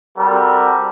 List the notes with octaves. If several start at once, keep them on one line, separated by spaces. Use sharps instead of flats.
G3 C4 F#4 A4 A#4